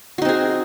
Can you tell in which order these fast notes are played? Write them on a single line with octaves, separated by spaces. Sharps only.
F#4 D#4 C4 G#4